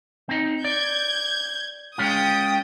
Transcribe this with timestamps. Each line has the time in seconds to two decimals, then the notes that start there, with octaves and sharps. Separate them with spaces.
0.29 C4 D#4
0.64 D5 G6 G#6
1.98 G#3 C#4 F4 G5 D#6